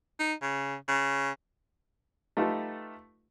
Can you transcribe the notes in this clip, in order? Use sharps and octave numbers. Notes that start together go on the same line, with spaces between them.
D#4
C#3
C#3
A3 D#4 F4 G4 A4 B4